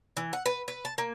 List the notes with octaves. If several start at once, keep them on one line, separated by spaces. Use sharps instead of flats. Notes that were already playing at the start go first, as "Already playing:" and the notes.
E3
F#5
B4
B4
A5
A#3